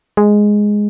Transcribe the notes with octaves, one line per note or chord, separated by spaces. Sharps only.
G#3